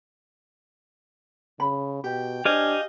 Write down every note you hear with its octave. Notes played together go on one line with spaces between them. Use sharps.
C#3 B5
B2 G4 G5
D4 G4 C5 D#5 F5 G#5